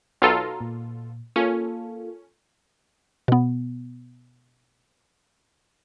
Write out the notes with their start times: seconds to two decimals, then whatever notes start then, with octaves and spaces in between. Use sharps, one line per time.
0.22 B1 F4 F#4 A4 A#5
0.60 A#2
1.36 A#3 C#4 F4 A4
3.28 B2 B3